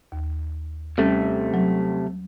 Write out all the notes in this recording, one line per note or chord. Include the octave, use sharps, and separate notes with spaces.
D#2
C3 G3 A3 C#4 A4
F#3